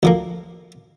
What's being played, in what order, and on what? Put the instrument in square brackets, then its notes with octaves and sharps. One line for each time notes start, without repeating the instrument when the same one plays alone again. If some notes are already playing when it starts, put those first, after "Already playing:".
[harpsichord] D2 F3 A#3